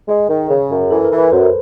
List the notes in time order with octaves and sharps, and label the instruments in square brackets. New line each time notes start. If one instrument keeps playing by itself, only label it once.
[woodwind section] G#3 [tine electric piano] G#4
[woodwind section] D#3
[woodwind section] C#3 [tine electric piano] G#4
[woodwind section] F#2
[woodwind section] E3 [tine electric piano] A4
[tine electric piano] A#4
[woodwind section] E3
[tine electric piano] B4
[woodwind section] F#2 [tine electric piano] C5